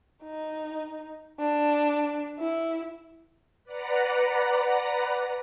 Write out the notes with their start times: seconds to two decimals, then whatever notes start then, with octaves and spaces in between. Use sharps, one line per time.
0.24 D#4
1.40 D4
2.39 E4
3.64 B4 D5 F#5 A#5